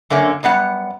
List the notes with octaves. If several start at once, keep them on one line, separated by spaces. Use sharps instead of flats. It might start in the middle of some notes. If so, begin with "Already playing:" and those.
F#2 D3 A#3 C#4
F#2 G3 B3 F#5